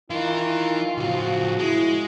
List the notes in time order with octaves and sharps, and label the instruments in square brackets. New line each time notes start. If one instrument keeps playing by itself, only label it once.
[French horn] D#3 [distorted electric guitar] E3 [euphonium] E4 [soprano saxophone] F4
[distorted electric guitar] A2 C#3 [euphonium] F3 [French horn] F#4
[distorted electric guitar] G#3 [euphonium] E4